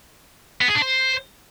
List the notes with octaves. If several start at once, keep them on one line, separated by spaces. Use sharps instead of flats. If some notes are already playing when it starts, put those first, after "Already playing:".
B3
G#4
D4
C5